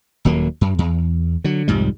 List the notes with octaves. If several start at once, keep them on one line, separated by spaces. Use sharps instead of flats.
D#1 D#2 F#3 A#3
F#2
E2
D3 F#3
C2 F2 G#2 G3